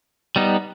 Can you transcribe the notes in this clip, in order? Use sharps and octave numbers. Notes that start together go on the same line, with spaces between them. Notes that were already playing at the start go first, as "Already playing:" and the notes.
G3 B3 D#4